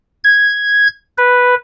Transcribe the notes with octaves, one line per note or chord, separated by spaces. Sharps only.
G#6
B4